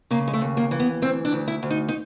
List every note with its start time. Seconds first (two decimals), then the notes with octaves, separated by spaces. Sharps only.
0.11 C#3 A#3
0.28 G#3
0.33 A3
0.42 D#2
0.57 A#3
0.71 E3
0.80 B3
1.02 D2 C4
1.25 D4
1.32 D2
1.48 E4
1.63 D2
1.70 D#4
1.89 D#4